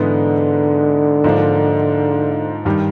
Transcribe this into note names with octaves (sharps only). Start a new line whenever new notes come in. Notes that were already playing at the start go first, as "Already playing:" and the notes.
Already playing: G#2 D3 E3 G#3 B3
G#2 F3 A#3 D4
G2 D#3 G3